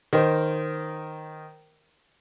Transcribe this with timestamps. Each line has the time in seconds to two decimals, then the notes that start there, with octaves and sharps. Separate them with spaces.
0.13 D#3 A#4 C5